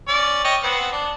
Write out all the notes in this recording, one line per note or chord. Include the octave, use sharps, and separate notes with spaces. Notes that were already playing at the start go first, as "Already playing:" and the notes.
C#4 D5
C#5 D#5 G5
B3 C4 F#5
D4